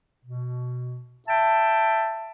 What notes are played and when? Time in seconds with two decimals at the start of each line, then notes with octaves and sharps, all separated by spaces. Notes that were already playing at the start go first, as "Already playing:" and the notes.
0.25 B2
1.29 E5 G5 A5